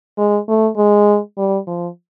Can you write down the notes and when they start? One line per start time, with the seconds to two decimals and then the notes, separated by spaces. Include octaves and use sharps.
0.18 G#3
0.48 A3
0.77 G#3
1.37 G3
1.67 F3